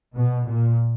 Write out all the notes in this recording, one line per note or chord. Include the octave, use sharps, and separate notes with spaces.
B2
A#2